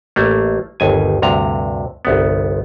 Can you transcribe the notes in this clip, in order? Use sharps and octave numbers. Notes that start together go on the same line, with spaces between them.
A1 A3 A#3
G1 D#2 G#5
D2 G2 C3 A#5
G1 C2 B3